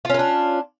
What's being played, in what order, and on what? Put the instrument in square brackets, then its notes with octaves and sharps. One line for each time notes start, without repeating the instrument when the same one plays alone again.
[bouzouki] F4
C#4
A#4
D4